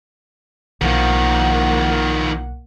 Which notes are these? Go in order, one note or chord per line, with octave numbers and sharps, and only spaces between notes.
B1 D#3 F3 A#3 F#5